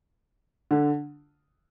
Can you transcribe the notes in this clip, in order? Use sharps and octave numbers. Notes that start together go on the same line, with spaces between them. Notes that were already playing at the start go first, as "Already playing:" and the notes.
D3